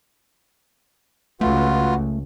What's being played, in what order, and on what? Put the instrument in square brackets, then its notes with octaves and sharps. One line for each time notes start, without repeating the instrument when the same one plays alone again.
[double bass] C#2 [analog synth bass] A3 [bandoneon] F4 [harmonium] F#4 B4 F#5